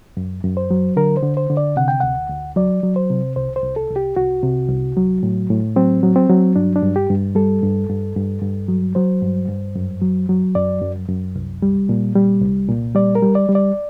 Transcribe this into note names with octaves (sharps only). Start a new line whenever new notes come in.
F#2
F#2
C5
F#3
D3 A#4
C5
D3
C5
D3
D5
C3 F#5
G5
D2 F#5
D2
F#3 D5
F#3
C5
C3
C2 C5
C5
C2
A4
C2
G4
C2 F#4
C3
C2
F#3
A2
A2
F#3 C4
F#3
C4
F#3
G2 D4
D4
G2
G4
G2
G3 A4
G2
G2
G2
G2
F#3
F#3 C5
G2
G2
F#2
F#3
F#3
F#2 D5
F#2
F#2
C2
G3
A#2
G3
C2
A#2
G3 D5
A#4
G3
D5
G3
D5